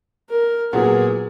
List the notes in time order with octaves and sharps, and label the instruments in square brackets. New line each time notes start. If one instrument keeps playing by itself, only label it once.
[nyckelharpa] A#4
[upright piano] A#2 F#3 B3 [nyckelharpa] G#4